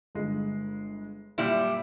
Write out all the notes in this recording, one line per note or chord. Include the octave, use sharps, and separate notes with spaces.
G1 G#3
F#2 A#2 G3 E4